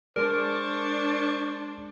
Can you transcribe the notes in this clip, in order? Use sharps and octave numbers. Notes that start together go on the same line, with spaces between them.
G#3 D4 G#4 A#4 C5 D5 A5 C#6